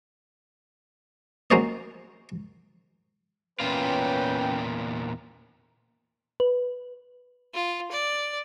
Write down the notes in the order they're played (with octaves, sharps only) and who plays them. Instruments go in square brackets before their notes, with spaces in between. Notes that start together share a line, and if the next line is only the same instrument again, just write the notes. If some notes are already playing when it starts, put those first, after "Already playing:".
[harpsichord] F#3 A#3 C#4 C5 C#5 D#5
[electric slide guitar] E2 A#2 F4 [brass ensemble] C#4 B4 G5
[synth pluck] B4
[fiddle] F4
D5